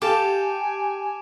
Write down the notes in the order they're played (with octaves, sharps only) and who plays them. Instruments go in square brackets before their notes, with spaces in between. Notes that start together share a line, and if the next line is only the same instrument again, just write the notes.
[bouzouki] G4 [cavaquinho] A4 F5 A5 [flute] G#5 [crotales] D6 D7 E7